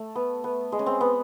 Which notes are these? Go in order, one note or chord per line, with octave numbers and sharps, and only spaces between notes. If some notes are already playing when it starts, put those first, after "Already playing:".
Already playing: A3
B3
B3
G#3
C#4
C4
B3